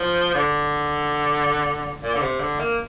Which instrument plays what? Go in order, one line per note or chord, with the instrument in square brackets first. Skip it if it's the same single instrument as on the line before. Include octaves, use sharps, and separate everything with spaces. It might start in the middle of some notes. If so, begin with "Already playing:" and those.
Already playing: [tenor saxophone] F3
D3
A#2
D3
C3
D3
A#3